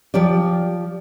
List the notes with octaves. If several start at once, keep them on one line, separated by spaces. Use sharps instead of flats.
F3 G4 D5